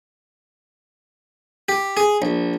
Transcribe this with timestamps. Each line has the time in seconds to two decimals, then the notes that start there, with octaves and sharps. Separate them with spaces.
1.69 G4
1.97 G#4
2.22 A#1